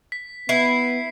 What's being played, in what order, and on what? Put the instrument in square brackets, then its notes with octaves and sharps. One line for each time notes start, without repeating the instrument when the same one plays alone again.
[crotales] B6
[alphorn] B3 [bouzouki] E4 B4 [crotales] C7